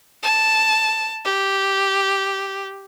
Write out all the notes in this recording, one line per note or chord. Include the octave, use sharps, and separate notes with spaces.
A5
G4